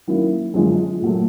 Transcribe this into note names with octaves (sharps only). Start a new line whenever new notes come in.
D#3 F#3 A#3 C#4 E4
F#2 D3 F3 G#3
A#2 F#3 A3